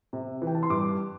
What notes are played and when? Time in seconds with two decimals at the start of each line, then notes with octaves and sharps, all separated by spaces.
0.13 C3
0.42 E3
0.47 G5
0.55 A5
0.63 C6
0.70 G2 D6